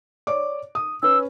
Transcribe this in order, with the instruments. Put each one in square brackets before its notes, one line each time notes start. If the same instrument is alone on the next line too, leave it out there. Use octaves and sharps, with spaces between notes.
[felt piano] C#5 D5 D6
D#6
[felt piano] C#4 B4 [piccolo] E6